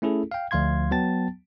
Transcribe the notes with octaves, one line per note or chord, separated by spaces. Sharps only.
A3 C#4 E4 G#4 A4
F5 G5
D2 F3 F5 C6 G#6
F#3 B3 G5 A5 A6